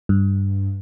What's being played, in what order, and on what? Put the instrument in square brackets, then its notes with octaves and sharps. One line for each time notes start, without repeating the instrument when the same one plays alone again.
[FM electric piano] G2